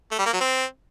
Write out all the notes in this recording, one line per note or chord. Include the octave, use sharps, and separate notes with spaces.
A3
G3
A#3
F#3
C4